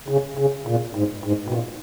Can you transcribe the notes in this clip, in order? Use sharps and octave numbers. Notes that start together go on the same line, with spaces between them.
C#3
C#3
A#2
G#2
G#2
B2
A#2